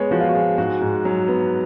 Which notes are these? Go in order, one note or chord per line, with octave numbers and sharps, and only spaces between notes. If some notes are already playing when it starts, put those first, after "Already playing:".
Already playing: G#3 B3 C#5
F3 F#4
F4
F#4
G#3
G#2 F#4
G#2
F#3
B3